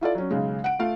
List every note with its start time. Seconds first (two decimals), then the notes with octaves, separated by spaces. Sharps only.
0.01 E4 F4 A4 D5
0.15 F#3 C#4
0.31 B1 C#3 G#3
0.64 F#5 D7
0.79 A3 F4 F5